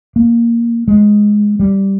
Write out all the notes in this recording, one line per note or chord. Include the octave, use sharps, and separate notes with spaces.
A#3
G#3
G3